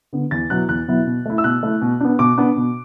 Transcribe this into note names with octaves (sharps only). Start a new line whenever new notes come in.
D3 B3
E2 A6
B2 F#3 B3 E4 F#6
E2 F#6
B2 F#3 B3 E4
B2
A3 E4
E6
B2 F#6
A3 E4
B2
B3 D4
B2 D6
B3 D4
B2